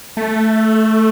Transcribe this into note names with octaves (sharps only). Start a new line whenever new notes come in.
A3